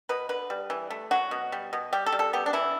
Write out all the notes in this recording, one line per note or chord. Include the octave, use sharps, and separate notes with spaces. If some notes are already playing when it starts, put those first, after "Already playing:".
B2 B4
D3 B4
G3
E3
A3
F#3 F#4
B2
G3
B2
G3 G4
A4
G3
A4
B3 G4
D4
E3 E4